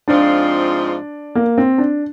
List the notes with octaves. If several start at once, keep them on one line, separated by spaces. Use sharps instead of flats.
G#2 F3 C4 D4 F4 G#4
A#3
C4
D4